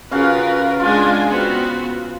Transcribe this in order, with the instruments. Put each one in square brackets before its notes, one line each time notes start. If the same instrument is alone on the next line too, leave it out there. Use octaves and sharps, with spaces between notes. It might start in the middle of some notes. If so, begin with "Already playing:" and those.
[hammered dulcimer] C#3 F#4 F5 [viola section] F4 A#4 B4
[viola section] G#3 D4 G#5 [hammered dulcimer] F4
[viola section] B3 C4 F#4